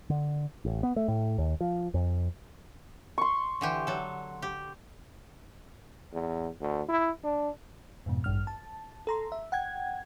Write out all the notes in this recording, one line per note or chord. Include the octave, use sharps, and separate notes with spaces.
D3
A1
B3
A3
A2
D#2
F3
F2
C6 C#6
D3 E3 G4
F#3 A4
G4
E2
D2
E4
D4
F2 G#2 B2
A1 G2 F6
A5
A4 A#5 C6
E5
F#5 G5 G#6